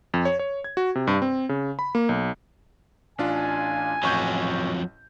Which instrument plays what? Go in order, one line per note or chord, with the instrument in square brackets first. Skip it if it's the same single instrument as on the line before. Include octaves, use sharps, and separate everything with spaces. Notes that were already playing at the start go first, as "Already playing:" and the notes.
[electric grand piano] F2
C#5
C#5
G#6
F#4
C3
G2
C4
C#3
B5
A#3
B1
[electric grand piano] A1 D4 F4 [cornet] G#5
[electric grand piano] A1 C#6 G6 [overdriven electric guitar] F2 F#3